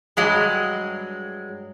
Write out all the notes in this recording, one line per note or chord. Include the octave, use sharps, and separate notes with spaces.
G2 F#3 G#3